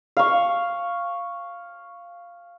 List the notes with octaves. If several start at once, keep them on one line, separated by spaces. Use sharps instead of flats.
F5 C#6